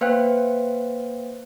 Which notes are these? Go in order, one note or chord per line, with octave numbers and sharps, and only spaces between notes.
A#3 B4 C5 F5 G5 F#6